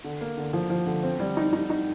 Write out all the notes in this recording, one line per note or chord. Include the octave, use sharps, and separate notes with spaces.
D3
A#3
D3
F3
F3
D3
C4
G3
D#4
D#4
D#4